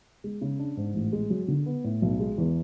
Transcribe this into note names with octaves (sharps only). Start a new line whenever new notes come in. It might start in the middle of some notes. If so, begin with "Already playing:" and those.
G#3
C#3
D4
G#2
A1
G#3
F#3
D3
B3
A2
B1
G#3
E2